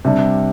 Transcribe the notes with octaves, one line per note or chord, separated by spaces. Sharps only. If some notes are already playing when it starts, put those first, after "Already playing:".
C3 G3 D4